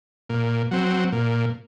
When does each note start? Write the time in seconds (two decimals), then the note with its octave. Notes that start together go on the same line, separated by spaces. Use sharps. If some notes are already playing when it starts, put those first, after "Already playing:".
0.29 A#2
0.71 F#3 C4
1.12 A#2